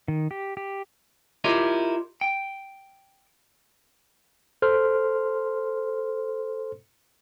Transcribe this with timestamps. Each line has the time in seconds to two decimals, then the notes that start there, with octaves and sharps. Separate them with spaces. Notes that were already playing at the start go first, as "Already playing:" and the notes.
0.08 D#3
0.31 G4
0.57 G4
1.44 E4 F4 G4 A#4 C#5 D#5
2.21 G5
4.62 A4 C5 C6 F6